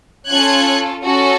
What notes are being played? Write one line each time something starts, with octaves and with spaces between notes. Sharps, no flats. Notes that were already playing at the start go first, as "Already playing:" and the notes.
C#4 F4 A4 F#6 G#6
C#4 F#4 A4